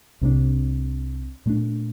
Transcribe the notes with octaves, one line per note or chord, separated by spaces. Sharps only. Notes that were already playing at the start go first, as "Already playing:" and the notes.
C2 C3 G3 D4
A#2 A3 D4